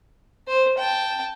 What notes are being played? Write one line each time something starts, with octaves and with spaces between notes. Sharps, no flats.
C5
G5 A5